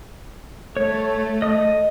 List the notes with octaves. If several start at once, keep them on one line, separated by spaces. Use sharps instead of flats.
A3 C#5
D#5 D#6